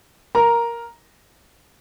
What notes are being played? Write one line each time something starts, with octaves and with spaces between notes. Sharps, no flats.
A#4 A#5